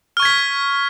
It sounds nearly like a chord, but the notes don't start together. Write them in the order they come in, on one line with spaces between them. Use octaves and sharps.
F6 C#6 G#6 B6